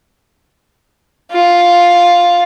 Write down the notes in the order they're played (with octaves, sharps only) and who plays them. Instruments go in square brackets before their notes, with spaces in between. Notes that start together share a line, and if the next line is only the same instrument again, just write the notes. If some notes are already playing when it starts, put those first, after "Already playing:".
[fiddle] F4